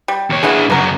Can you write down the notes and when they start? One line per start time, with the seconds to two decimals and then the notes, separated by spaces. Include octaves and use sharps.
0.08 G3
0.30 D#2 C#5
0.43 A3 B3 D4 E4 G#4
0.70 F#2 C#3 B3 A#4